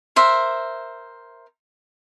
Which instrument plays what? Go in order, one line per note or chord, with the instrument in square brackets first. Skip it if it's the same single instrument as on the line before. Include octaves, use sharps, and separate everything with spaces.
[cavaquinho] A#4 C5 E5